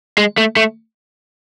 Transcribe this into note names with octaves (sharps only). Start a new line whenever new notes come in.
G#3
A3
A3